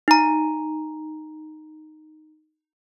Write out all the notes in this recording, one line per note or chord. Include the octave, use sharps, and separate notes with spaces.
D#4 A#5